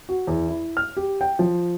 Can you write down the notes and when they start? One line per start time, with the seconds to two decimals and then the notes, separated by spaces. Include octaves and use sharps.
0.09 F#4
0.27 E2
0.48 E4
0.77 F6
0.97 G4
1.21 G5
1.39 F3